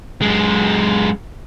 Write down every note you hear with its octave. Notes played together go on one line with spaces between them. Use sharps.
F#2 G#3